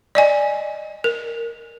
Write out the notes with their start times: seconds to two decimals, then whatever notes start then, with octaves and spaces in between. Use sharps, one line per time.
0.15 D5 D#5 G#5
1.04 A#4